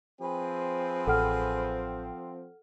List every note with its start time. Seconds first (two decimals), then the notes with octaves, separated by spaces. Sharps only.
0.21 F3 C4 G#4 B4
1.07 A1 A4 F#5 F6